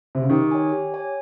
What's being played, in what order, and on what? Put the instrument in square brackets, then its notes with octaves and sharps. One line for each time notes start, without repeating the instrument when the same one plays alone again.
[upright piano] C3
C#3
[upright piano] D#3 [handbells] G4
[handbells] C#5 G#5
G4
C#5 G#5